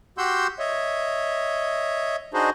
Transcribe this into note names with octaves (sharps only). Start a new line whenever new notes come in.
F#4 G4 F#5 C6 E6 G6
C#5 D#5 E5
D4 D#4 F#4 G#4 C5 D#5